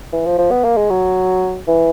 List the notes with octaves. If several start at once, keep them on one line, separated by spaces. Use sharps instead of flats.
E3
F3
F3
B3
A#3
G#3
F#3
E3